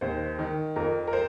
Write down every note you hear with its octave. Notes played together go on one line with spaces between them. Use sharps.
D#2 C5
D#3
F2 A#4
A#4
C5